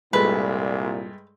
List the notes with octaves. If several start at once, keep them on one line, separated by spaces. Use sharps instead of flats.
C2 G2 A#2 G#3 A3 B4